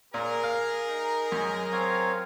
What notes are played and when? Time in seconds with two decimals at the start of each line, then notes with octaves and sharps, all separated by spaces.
0.14 A#2 G#4 A#4
0.44 F5
0.87 D#4
1.32 F#2 G#3
1.72 C4 C#5 F5